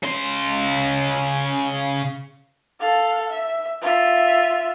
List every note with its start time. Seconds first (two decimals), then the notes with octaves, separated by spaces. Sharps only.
0.03 C#3 C6
2.80 A4 F5
3.30 E5
3.82 F4 E5